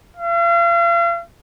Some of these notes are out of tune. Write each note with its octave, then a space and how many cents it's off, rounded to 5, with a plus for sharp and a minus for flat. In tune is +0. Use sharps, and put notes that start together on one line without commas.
F5 -40